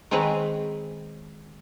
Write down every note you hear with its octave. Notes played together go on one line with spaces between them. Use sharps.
D#3 G#3 C4 G#4 B4 C#5